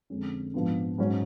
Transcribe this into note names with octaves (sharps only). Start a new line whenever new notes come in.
F2 D3 G#3 C#4
G#2 F3 B3 D4
G#2 F#3 C#4